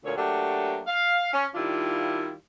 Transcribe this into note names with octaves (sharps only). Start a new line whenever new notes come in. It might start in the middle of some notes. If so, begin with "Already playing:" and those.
D2 A#2 C#5
F#3 A3 A#3 D4 F#4 G4
F5
C#4
D#3 G3 D4 E4 F4